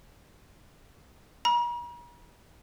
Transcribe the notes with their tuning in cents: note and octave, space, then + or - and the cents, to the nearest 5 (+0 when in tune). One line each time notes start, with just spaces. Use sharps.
A#5 +45